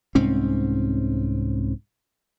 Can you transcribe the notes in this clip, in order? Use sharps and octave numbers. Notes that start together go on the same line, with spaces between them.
C2 G#2 C4 C#4